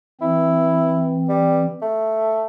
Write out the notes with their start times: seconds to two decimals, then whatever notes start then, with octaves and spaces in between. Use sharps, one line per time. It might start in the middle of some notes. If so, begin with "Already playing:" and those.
0.21 E3 C4 E4
1.29 G3
1.82 A3